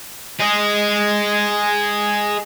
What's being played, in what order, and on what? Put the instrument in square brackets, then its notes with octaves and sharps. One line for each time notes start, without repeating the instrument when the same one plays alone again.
[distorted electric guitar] G#4 D#5